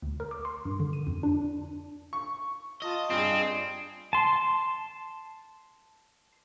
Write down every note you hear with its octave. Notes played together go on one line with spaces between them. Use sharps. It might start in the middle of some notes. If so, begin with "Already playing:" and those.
D2
A#4
D6
C6
G2
D3
D#7
F2
D4
C#6
F4 D#5 A5
G2 C4 D4 G#4
A5 C6